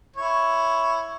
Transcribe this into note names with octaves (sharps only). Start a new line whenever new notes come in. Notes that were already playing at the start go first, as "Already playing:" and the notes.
E4 C#5